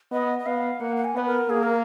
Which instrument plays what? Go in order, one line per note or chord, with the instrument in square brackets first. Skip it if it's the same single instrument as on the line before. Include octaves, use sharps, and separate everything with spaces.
[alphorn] B3 [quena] D#5
[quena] D#5
[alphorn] B3 [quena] F5
[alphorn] A#3 [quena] F#5
[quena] F#5
G#5
[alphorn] B3 [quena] B4
[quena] A#4
[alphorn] A#3 [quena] G#4
[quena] A#4